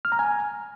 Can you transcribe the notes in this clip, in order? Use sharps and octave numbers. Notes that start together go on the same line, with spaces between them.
F6
A#5
G#5